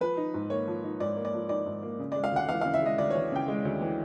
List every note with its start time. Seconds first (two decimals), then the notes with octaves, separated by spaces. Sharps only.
0.01 F3 B4
0.17 D#4
0.34 G#2
0.50 A#3 C#5
0.68 F3
0.83 D#4
1.00 G#2 D5
1.17 A#3
1.25 D5
1.34 F3
1.49 D#4 D5
1.66 G#2
1.83 A#3
1.99 C#3
2.12 D5
2.16 G#3
2.24 F5
2.32 D2 F#5
2.49 E3 F5
2.61 C#3 F5
2.74 E5
2.82 G#3 D#5
2.98 D2 D5
3.10 C#5
3.15 E3
3.32 C#3 G5
3.48 G#3
3.65 D2
3.81 E3